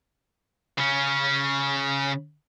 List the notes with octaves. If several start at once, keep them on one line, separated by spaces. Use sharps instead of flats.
C#3 C#4